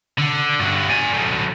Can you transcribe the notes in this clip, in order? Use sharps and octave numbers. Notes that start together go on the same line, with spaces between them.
D3
G2 F#4
D5 G#5
F#3 A3